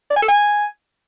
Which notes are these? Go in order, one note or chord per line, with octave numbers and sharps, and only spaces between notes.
D5
G#5
A4
G#5